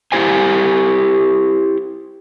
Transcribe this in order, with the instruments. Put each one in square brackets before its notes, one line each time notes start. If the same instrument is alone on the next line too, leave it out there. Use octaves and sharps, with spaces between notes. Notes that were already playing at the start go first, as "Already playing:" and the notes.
[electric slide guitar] E4 G4 C5 G#5